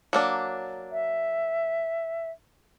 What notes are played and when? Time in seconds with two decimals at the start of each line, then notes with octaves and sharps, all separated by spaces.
0.13 F#3 A#3 D4
0.92 E5